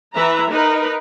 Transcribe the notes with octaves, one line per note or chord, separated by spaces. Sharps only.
E3 B4 E5 A#5
D#4 A#4 B4